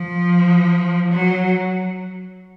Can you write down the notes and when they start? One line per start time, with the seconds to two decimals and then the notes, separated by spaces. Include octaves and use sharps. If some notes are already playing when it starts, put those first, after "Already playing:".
Already playing: F3
1.12 F#3